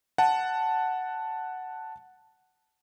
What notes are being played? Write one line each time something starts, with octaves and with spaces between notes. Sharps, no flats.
F#5 A5